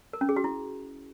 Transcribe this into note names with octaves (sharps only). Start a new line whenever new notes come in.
A#4
C#4
G#4
F#4
E4